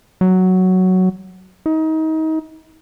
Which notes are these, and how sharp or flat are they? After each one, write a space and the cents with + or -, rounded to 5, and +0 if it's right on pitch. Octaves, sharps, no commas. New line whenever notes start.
F#3 +5
D#4 +30